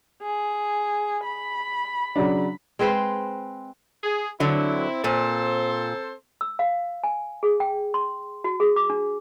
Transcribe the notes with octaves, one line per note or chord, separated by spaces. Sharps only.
G#4
B5
C#3 F#3 D4
G#3 C4 B4 C5
G#4
D3 F#3 C4 E4
A#2 C4 A4 C5
E6
F5
G#5
G#4
G5
C6
F#4
G#4
D6
D4